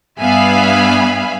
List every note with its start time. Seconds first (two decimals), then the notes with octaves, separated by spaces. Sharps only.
0.20 G2 B3 E5 F5 G#5 B5